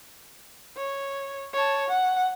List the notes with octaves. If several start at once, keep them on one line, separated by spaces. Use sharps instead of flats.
C#5
C#5 A5
F#5